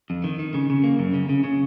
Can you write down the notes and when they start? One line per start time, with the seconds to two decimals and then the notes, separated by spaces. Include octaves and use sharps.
0.10 F2
0.24 D#3
0.39 D#3
0.54 C#3
0.70 C#3
0.84 A#3
0.99 F#2
1.14 C#3
1.29 C#3
1.44 C#3